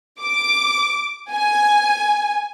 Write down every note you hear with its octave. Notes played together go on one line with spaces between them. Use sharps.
D6
G#5